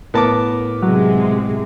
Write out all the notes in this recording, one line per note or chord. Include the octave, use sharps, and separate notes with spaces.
A2 B3 A#4 A5 D6
C3 F#3 G#3